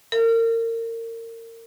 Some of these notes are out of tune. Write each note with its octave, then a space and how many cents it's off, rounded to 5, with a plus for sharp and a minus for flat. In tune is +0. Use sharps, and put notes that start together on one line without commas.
A#4 -30